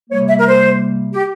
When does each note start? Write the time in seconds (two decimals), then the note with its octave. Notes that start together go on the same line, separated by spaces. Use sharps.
0.10 C3 G3 A#3 C#5
0.29 E5
0.38 A#4
0.48 C5
1.13 G4